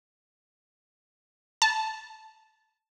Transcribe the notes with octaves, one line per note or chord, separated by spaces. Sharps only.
A5